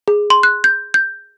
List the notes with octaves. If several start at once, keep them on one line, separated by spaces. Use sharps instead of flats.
G#4
C6
F#6
G6
G6